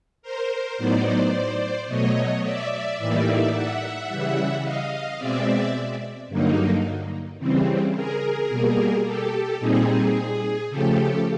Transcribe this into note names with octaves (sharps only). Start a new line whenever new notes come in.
A#4 C5
A2 F#3 B3 D#4 C5 D5
B2 F#3 A3 C#5 D#5
D5 E5
A2 E3 G3 A#3 D#4 D5 E5
E5 F#5
C#3 E3 G3
D#5 F5
B2 G#3 C4 D5 E5
G2 D3 F#3 A#3 D#4
C#3 E3 G3 C4
G#4 A#4
B2 G3 A#3
G4 A4
A#2 G3 C4 D#4 G#4
C#3 F3 A3 G4 A4